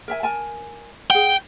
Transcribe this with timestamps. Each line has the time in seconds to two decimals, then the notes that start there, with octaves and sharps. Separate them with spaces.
0.08 A#4 E5 G#5
0.23 A#4 G#5 A5
1.10 G#4 F#5 G5